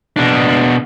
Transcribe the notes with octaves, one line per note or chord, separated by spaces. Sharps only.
B2 D4